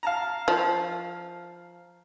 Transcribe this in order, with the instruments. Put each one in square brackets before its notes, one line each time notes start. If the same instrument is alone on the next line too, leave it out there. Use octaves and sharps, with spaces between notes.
[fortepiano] F5 A5 A#5
[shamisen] F3